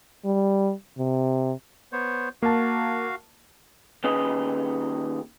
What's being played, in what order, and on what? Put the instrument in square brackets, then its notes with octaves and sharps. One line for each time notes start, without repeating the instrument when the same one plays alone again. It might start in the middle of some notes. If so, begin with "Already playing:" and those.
[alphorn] G3
C3
[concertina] B3 C5 C#5
[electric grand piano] A#3 A5 [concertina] F#4 F5
[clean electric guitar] D#2 C#4 G#4 B4 D#5